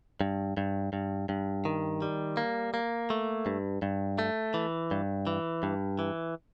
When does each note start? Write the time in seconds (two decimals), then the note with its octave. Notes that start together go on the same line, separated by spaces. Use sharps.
0.21 G2
0.57 G2
0.93 G2
1.29 G2
1.65 D#3
2.02 G3
2.37 A#3
2.74 A#3
3.10 A3
3.46 G2
3.82 G2
4.19 A3
4.54 E3
4.91 G2
5.27 E3
5.63 G2
5.99 E3